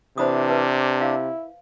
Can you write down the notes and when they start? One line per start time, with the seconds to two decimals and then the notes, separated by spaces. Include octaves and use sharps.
0.18 C3 E3 D4 C5 B5 D#6
0.49 B4 A5
1.01 E4 F5